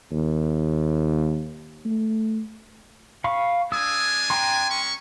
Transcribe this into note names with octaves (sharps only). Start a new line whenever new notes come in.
D#2
A3
F5 B5 C#6
G#3 D4 G#5 D#6 E6
G5 A#5 C6
G#3 C#4 C#6